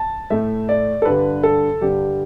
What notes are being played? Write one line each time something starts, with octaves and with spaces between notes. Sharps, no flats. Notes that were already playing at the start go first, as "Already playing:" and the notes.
Already playing: A5
A2 A3 E5
D5
A4
G2 D3 G3 B4
A4
G2 D3 G3 G4